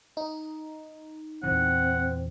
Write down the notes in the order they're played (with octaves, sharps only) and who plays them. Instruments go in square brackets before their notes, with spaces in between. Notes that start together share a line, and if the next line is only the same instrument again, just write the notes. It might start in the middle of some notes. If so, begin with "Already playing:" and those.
[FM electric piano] D#4
[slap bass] E2 A#2 E3 [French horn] C4 [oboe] F#5